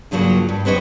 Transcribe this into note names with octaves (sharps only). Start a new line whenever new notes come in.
G2 C#3 F3 F#3 A#3 A#4
G2
F#2 C4 B4 C#5 D#5